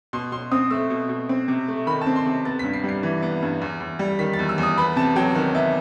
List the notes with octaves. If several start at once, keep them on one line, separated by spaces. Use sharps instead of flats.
B2 C6
B2 C6
C4 D#6
A3 E6
B2
B2
C4
C3
A3
D#3 B5
A5
C4
C6
C3
B3 A6
G2 B6
C7
G3
C7
E3
B3
G2
E2
E2
G3
D#3 B6
A6
E2
E6
E2 D#6
B3 B5
C3 A5
F#3 G5
D#3 F#5
B3 E5